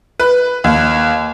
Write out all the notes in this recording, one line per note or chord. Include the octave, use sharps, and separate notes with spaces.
B4
D#2